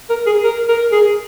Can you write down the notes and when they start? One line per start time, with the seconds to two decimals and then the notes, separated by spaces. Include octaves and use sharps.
0.10 A#4
0.27 G#4
0.44 A#4
0.69 A#4
0.92 G#4